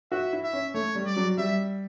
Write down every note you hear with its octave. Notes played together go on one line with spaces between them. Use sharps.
F#4 E5
E4
E5
C#4
A3 C#5
G3
D5
F#3
G3 E5